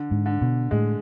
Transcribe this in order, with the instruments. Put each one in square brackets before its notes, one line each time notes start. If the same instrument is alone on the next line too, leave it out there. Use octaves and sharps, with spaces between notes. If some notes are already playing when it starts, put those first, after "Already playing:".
Already playing: [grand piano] D3
[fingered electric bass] G#2
[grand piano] D3
[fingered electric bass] B2
[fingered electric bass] A2 [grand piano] G#3